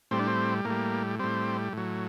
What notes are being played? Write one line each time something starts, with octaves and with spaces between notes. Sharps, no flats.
A2 G3 C4
D4
C4
A2 A#3
G3
A2 G3 C4
A2 F#3